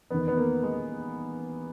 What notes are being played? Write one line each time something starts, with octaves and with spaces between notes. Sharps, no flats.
E2 D#3 B3
B3
A#3
G#3